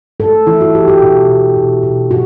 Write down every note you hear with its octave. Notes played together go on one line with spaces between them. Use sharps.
A3 A4
E3 E4
F#4
E3 G4
G4
B2
B2
B2
B2
F#4